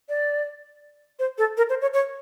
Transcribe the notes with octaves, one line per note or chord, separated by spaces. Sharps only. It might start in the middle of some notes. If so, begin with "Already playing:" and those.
D5
C5
A4
A#4
C5
C#5
C#5